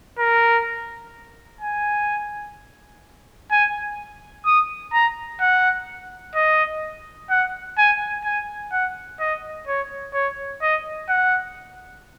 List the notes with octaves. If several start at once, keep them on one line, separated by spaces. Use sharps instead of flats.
A#4
G#5
G#5
D#6
A#5
F#5
D#5
F#5
G#5
G#5
F#5
D#5
C#5
C#5
D#5
F#5